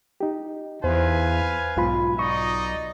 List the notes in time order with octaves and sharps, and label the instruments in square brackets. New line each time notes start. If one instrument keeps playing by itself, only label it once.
[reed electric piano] D#4 G4
[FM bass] E2 [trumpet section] B4 F5 G#5 [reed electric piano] C5
[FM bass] B1 [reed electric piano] G#2 F4 B5
[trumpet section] D#4 D5 D#5 [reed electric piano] C#6